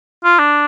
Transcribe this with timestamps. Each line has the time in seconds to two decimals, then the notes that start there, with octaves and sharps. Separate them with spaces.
0.24 F4
0.39 D4